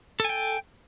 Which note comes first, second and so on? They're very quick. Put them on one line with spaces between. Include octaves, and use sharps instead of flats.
A4 G#5 G5